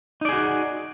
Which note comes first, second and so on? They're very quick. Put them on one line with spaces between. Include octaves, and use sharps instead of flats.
D#4 D5 G#4 F#4